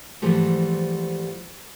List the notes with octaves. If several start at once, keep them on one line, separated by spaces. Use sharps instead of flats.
G#2 E3 F3 G3 A3